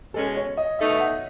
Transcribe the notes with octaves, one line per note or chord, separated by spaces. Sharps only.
B2 G#3 C#4 A4
C#5
D#5
B2 A3 D#4 A4 E5
E5
F#5